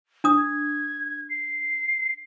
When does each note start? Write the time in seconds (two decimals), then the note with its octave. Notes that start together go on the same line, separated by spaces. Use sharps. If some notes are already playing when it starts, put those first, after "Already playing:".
0.24 D4 D#6
0.37 G#6
1.29 C7